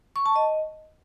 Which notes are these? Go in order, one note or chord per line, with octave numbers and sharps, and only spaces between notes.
C#6
A5
D#5